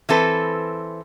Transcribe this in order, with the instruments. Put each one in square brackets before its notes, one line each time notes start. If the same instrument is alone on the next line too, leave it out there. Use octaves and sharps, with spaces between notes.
[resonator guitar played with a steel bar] E3 C4 A4 B4